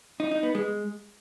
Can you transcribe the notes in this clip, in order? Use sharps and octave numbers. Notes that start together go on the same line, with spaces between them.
D#4
D#4
B3
G#3